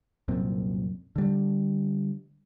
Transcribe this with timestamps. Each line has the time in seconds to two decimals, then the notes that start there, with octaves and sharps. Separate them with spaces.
0.28 C2 F#2 A#2 C4
1.16 D3 G3